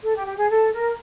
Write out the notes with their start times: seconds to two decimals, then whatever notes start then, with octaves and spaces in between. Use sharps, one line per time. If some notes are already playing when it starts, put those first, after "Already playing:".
0.02 A4
0.15 G4
0.26 G4
0.37 G#4
0.49 A4
0.72 A#4